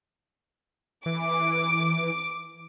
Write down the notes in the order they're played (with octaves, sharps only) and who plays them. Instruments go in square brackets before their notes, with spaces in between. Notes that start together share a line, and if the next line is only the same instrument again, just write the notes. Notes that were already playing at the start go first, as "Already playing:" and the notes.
[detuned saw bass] E3 [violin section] D6